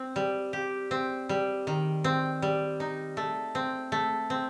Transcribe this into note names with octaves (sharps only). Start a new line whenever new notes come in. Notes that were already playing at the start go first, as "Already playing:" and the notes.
Already playing: C4
G3
G4
C4
G3
D#3
C4
G3
D#4
A3
C4
A3
C4